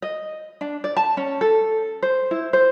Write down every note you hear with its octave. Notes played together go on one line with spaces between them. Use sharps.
D#5
D4
D5
A5
C#4
A4
C5
E4
C5